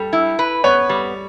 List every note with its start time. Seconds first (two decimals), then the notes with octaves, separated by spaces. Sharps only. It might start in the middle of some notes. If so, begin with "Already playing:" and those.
Already playing: G3 A4
0.13 E4
0.39 B4
0.64 B3 C#5
0.89 G3